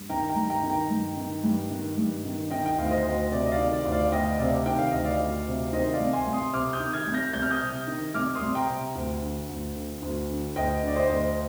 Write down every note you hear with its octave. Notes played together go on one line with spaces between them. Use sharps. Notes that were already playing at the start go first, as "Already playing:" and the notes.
Already playing: G2
D#3 G5 A#5
G5 A#5
G2
G5 A#5
D#3
G5 A#5
G2
D#3
G2
D#3
G2
D#3
D#3 D#5 G5
G5
D2 F5
C5 D#5
D2
C3 D5
D#5
D5 F5
D#3
D5
D2
D5 F5
D2 D#5 G5
C3 D5 F5
D#3 G5
F5
D2 D#5
D5 F5
D2
C3
D#3 C5 D#5
D5 F5
C2
G#5 C6
C2
C6 D#6
C3 D6 F6
D#6 G6
D#3
F6 G#6
C2
G6 A#6
C2 G6
F6
D#6 G6
C3
D#3
C2 D6 F6
C6 D#6
C2
G5 A#5
C3
D2
D3
D2
D3
D2
D3
D2 D#5 G5
D3 D5
C5 D#5
D2